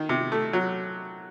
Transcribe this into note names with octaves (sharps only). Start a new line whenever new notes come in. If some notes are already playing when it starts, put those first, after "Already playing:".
Already playing: D#3
C3
A3
F#3